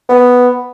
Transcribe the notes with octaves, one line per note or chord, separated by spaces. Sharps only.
B3